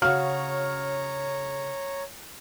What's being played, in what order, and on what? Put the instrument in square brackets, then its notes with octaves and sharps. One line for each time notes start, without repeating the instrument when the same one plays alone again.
[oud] C#3 F#4 [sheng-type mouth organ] C#5 A#5 [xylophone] F5 F#5 [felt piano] F6